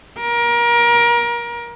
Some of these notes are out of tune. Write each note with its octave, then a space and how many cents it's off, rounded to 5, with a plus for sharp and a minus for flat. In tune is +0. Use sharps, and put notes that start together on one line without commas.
A#4 +25